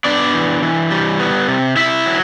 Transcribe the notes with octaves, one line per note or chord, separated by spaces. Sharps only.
B3 D4 D5
E3
E3
G3
B3
C3
C3 E4 E5
F#3